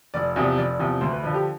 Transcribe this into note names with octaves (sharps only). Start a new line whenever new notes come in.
F1 D5
E2 C3 F3 D5
F1 D5
E2 C3 F3
D2 C5
B4
D3 F3 B4
G4